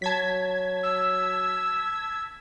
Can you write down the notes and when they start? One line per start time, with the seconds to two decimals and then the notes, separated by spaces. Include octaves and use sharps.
0.02 F#3 A5 G#6 B6
0.83 E6